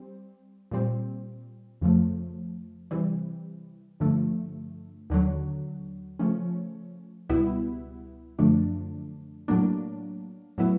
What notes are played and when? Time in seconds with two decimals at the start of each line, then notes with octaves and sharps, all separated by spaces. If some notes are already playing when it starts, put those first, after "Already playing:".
Already playing: G3 C4
0.71 A#2 G3 C4
1.81 F2 C#3 F3 A3
2.91 C3 E3 G3
4.00 G2 D3 F3 A3
5.10 D#2 D3 F#3
6.19 C#3 F3 A3 C#4
7.29 C#2 B2 G3 B3 E4
8.39 F#2 D3 F3 A3 D4
9.48 A2 F#3 A#3 D4
10.58 A2 F#3 B3 E4